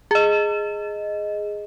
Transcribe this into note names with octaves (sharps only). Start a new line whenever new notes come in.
G#4 D#5